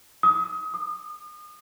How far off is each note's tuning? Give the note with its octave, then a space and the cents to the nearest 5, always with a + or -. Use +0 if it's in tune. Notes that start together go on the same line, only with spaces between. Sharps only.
D#6 +30
D#6 -40